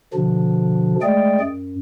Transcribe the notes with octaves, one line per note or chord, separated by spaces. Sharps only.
B2 D3 F3 D4
G#3 A3 G#4 D5 G5
F#2